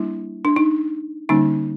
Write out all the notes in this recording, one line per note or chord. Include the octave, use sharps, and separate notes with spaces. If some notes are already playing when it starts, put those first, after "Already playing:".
Already playing: G3 A#3 D4 E4
D4
D#4
D3 G3 A#3 C#4 D#4